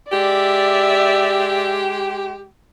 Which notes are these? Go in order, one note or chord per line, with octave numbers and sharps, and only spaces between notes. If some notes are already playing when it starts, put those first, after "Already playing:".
G#3 G4 D5 E5